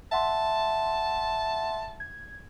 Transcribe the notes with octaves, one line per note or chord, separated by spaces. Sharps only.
E5 F#5 A5 C6
G#6